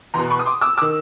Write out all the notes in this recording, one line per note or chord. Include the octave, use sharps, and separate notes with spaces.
E2 B2 A#5 C6
B5 C#6
D#6
C6 D6
D6 E6
D6 E6
D#3